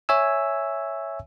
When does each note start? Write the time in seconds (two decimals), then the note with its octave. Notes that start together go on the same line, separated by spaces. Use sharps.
0.09 C#5 E5 G#5 E6